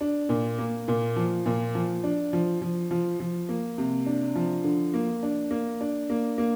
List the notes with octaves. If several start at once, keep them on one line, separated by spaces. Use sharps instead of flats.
D4
A#2
A#3
A#2
F3
A#2
F3
D4
F3
F3
F3
F3
A#3
C3
D4
F3
D3
A#3
D4
A#3
D4
A#3
A#3